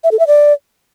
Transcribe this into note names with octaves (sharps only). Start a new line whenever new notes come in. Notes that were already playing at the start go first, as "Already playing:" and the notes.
E5
A4
E5
D5